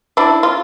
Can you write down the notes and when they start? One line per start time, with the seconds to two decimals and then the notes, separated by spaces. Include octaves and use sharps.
0.17 D4 E4
0.43 F4